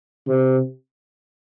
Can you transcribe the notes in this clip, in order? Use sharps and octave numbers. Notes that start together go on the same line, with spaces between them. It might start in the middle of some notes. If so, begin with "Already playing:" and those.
C3